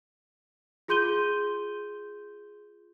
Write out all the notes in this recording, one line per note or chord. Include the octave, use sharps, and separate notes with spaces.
F4 G#4 C6 G6 D#7 G7